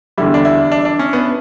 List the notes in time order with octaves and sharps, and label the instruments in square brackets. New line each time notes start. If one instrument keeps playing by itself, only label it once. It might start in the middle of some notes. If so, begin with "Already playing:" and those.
[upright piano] E2 D3 G3 [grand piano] E4
[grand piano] D4
E4
D4
D4
C#4
B3